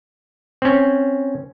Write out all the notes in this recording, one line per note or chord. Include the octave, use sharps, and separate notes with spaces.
C4 C#4